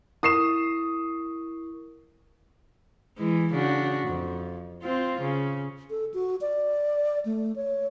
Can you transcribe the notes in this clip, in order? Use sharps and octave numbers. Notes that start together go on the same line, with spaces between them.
E4 A#4 C#6 D#6 C7 E7
E3 G#3
C#3 D4 F#4
F2
C4 F4
C#3
A4
F#4
D5
A3
C#5